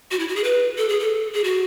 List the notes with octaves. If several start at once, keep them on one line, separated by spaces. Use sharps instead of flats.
F#4
E4
F#4
G#4
B4
A4
G#4
A4
G#4
F#4